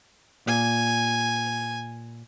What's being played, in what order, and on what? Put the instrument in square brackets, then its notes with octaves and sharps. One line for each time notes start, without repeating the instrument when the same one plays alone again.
[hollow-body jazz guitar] A#2 [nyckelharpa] G#5